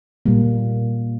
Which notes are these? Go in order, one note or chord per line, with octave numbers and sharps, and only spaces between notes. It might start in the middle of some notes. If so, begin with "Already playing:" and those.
A#2 G3 A#3